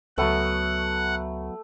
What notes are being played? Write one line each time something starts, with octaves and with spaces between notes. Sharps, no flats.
C#2 F#3 A3 B3 F#5